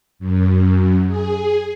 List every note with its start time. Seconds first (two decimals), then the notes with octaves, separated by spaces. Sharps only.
0.19 F#2
1.07 G#4